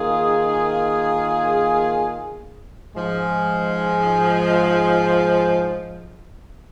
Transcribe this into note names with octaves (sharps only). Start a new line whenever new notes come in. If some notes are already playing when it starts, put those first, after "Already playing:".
Already playing: D#3 A#3 F4 G#4
G#2 F3 G#3